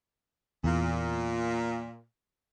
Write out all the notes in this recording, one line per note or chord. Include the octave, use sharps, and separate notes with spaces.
E2 A#2